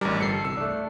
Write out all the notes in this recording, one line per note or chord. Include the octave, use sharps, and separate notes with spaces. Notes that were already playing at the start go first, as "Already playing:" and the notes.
A1 G3 D4 A#4 D5
G1 A4 C7 C#7
C2 E6
A3 D4